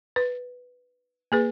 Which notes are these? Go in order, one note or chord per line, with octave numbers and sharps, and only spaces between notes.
B4
A#3 G#4 B4